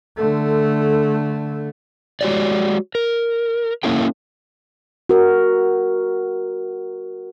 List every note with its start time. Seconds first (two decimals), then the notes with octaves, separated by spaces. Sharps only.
0.17 D3 A3
2.21 G#3 F#4 G4 C#5 D5
2.95 A#4
3.83 A#3 C#4 E4 A4 G5
5.09 F#4 A#4